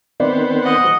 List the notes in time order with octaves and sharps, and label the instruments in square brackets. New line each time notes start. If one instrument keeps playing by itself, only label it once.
[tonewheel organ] D#3 C4 [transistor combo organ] B3 C5 [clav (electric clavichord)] D5
[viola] D#5 F#5